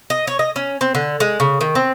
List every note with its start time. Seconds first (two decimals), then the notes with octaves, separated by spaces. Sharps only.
0.10 D#5
0.27 C#5
0.39 D#5
0.56 C#4
0.81 C4
0.95 D3
1.20 G#3
1.40 C#3
1.61 D#3
1.75 C4